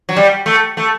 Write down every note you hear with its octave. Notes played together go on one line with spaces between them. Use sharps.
F#3
G3
A3
A3